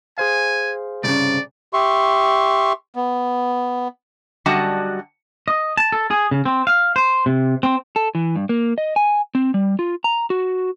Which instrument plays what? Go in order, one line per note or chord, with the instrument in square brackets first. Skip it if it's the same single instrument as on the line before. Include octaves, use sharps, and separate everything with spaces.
[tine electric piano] G#4 C5 F5 [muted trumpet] G#5
[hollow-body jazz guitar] C2 G2 C#3 [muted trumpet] D5
[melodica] G4 E5 C6 C#6
B3
[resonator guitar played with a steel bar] F#2 D3 G3 F#4 D#5 A5
[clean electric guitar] D#5
A5
A4
G#4
C#3
C4
F5
C5
C3
C4
[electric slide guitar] A4
E3
G2
A#3
D#5
G#5
C4
G3
F4
A#5
F#4